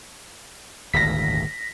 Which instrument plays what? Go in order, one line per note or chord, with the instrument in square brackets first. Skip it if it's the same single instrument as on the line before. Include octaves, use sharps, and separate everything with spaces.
[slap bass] D#1 G#1 D2 [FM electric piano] A#6 B6